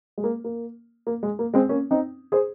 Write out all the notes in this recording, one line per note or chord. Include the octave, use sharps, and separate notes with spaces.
G#3
A#3
A#3
A#3
G#3
A#3
G#3 C4
A#3 C#4
C4 D#4
G#4 C5